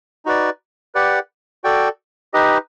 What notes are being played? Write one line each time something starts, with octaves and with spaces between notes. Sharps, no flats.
D#4 F#4 B4 D5
G4 B4 D5 F#5
F#4 A4 D5 G5
D#4 G4 B4 D#5